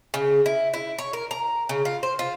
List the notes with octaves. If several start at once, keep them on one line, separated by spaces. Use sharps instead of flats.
C#3
E4
E4
C#5
A#4
A#5
C#3
F4
C5
F4